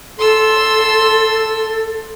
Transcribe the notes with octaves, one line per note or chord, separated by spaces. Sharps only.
A4 C6 E6